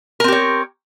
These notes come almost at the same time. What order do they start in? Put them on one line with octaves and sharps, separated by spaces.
A#4 C4 G4 C#5